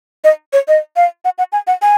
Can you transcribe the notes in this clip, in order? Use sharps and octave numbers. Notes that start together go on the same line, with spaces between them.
D#5
C#5
D#5
F5
F#5
F#5
G#5
F#5
G#5